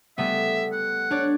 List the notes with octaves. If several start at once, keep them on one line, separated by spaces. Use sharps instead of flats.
G3 A3 B3 E5
F#5
D4 C#5 D5